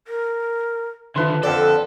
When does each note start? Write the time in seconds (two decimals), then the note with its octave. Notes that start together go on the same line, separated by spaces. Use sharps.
0.08 A#4
1.16 D3 D#3 F3 B4 E5 C6
1.43 F2 D3 A4 D5 G5